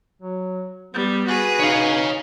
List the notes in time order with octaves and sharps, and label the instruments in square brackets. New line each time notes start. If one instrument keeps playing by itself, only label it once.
[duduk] F#3
[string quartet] G3 [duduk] B3
[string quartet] F#4 G#4 B4
[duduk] D#4 [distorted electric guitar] C#5 F5